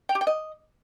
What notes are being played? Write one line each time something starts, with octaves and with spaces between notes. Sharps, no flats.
G5
G4
G5
D#5